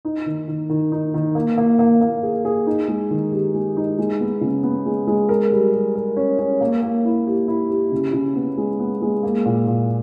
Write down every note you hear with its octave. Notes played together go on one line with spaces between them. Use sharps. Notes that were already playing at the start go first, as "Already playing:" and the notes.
D#4
D#3
D#3
D#3
D#4
D#3
A#3
A#3
A#3
A#3
G#4
G#4
D#4
G#3
D#3
G4
G#3
D#4
G#3
B3
C#3
B3
G#3
G#3
A#4
G3
G3
A#4
C#4
C#4
A#3
A#3
E4
G4
E4
G4
C#3
C#3
B3
G#3
B3
G#3
A#3
A#2
A#2